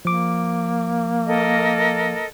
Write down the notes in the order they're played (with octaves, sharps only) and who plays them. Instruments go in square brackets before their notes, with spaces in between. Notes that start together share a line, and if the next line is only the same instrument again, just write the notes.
[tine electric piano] F3 D6 [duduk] A#3
[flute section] A4 A#4 D#5